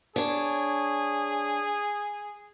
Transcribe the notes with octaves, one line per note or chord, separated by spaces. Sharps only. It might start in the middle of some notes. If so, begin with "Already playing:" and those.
D4 G#4 C#5